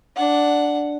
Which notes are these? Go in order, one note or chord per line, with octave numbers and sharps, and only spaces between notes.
D4 F#5